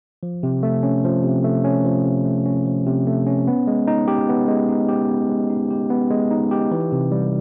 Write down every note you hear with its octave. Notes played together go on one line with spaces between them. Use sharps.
F3
C3
A3
C#4
F3
C3
A3
C#4
F3
C3
A3
C#4
F3
C3
A3
C#4
B3
G#3
D#4
G4
B3
G#3
D#4
G4
B3
G#3
D#4
G4
B3
G#3
D#4
G4
E3
C3
G3